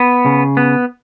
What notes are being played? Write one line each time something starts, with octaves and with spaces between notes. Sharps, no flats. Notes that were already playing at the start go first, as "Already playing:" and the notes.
Already playing: B3
C#3
B3